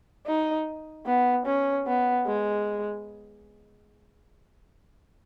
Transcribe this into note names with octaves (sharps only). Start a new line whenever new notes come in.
D#4
B3
C#4
B3
G#3